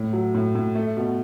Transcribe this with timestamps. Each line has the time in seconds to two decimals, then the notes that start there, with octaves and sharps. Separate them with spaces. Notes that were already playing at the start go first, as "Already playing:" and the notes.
Already playing: A2
0.13 F#3
0.35 A2
0.55 A2
0.75 A3
0.97 B2